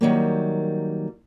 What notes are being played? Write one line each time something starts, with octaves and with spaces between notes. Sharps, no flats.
D#3 F#3 G3 A#3